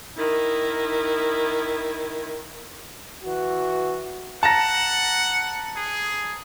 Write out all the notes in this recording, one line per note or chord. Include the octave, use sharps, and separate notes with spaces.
D#3 E4
E3 F#4
F#5 A5 A#5 A#6
G#4